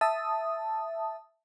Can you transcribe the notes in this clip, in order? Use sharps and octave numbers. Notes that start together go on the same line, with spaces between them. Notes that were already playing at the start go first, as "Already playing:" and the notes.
E5 A5 D#6